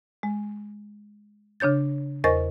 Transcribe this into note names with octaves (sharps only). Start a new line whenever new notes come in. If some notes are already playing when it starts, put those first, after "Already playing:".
G#3
C#3 D4 C#5 G6 A6
E2 A#4 C5 D#5 C#6 A6